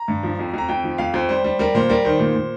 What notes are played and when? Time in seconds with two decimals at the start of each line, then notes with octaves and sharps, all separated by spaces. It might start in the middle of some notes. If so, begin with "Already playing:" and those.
Already playing: A#5
0.08 G2
0.23 F3
0.39 F2
0.54 F2 A#5
0.69 F2 G5
0.84 F3
0.98 F2 F5
1.14 F2 C5
1.29 G3 C5
1.44 G3
1.59 G3 A#4
1.75 A#2 C5
1.89 G3 A#4
2.05 D#3 C5
2.19 A#2
2.35 A#2